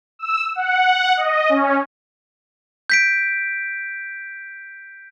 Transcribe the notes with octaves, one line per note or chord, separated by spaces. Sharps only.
E6
F#5
D#5
C#4
G6 B6 D7